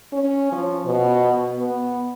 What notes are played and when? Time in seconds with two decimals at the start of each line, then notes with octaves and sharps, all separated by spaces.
0.12 C#4
0.52 F3
0.85 B2
1.58 B3